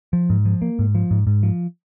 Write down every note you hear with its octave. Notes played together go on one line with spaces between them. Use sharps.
F3
G#2
F3
A#3
G#2
F3
G#2
G#2
F3